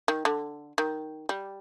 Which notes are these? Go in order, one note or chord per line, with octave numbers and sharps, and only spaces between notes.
D#3
D3
D#3
G3